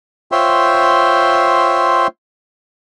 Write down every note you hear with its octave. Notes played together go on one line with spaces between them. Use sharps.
F4 C5 C#5 E5 G5 C6